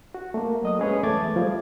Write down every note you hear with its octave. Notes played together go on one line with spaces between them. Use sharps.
F#4
A3 A#3
F#3 D#5 D#6
G#3 C#4 G#4 B4 C#5
E2 A3 D6 G#6 A6
F3 G3